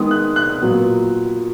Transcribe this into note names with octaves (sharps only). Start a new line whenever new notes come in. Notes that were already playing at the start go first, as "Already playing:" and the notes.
Already playing: D#3 G#3 B3 D#6
F#6
F#6
A#2 F#3 B3